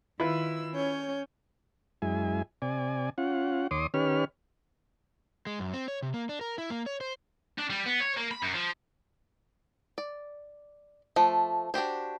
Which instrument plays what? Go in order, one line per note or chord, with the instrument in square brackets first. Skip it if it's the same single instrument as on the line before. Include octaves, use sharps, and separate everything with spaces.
[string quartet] D#3 E6 [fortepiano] E4 F4 B4
[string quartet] C#4 C#5 G6
[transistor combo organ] F#2 G#3 E4 G#5
C3 D5 G#5
C#4 F4 F#5
D#2 C#5 C6 D6 D#6
D#3 C#4 G4 B4 C#5 F6
[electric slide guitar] G#3
F#2
C4
C#5
C3
A#3
D4
A#4
E4
A#3
C#5
C5
[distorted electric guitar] D4
G3
B3
C#5
A#3
B5
F#2
F3
[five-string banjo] D5
F3 A3
D4 F#4 G4 C5